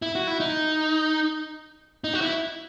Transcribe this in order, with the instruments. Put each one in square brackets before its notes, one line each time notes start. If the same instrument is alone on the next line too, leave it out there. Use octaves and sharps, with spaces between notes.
[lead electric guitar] E4
F#4
E4
D#4
D#4
F#4
E4